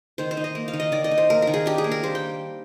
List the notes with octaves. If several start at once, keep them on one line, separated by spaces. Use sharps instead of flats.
D#3 C5
C5
D#4
D#5
A#3
F5
D#3
D#5
D#3 D5
D#5
D#4
C5
A#3 A#4
A#4
D#3
G#4
D4 G4
G#4
A#3
A#4
G3 C5
G5